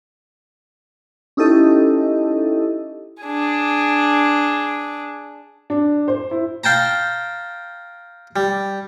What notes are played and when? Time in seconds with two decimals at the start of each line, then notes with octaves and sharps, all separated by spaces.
1.37 C#4 D#4 E4 G4 A4 D#5
3.23 D4 G#4
5.70 D4
6.08 C5
6.31 E4
6.64 F5 G5 A5 A#5
8.36 G3